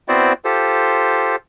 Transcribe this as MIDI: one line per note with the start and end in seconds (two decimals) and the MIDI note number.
0.08 0.33 59
0.08 0.33 60
0.08 0.33 64
0.08 0.33 66
0.08 0.33 72
0.08 0.33 74
0.45 1.36 65
0.45 1.36 67
0.45 1.36 69
0.45 1.36 72